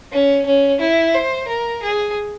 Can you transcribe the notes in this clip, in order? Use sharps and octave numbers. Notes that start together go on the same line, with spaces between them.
C#4
C#4
E4
C5
A#4
G#4